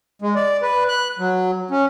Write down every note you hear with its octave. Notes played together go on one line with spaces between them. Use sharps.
G#3
D5
B4
F#6
F#3
C#4